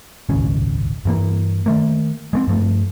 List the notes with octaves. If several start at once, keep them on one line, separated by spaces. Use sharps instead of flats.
D#1 G#1 C#2 C#4
G2 E3 A#3
D#3 A3 A#3
G#3 A3 C4
G2 F3 A3